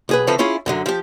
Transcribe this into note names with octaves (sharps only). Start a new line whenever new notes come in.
B1 G#4 B4
C#3 E3 F3 C4 A4 B4
C#4 E4 F4 G#4
F#2 D3 F#3
F3 G4